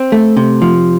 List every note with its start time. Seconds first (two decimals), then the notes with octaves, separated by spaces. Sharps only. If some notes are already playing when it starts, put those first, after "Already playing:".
Already playing: C4
0.12 A3
0.37 C3
0.62 F3